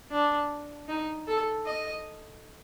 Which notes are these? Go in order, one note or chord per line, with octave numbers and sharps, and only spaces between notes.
D4
D#4
A4
D#5